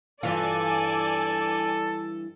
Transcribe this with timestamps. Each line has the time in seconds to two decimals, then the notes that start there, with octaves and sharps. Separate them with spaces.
0.23 G2 E3 F4 A4 D5 G#5